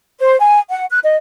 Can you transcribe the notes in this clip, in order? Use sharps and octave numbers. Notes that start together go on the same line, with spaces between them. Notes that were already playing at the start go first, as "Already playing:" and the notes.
C5
G#5
F#5
F#6
D#5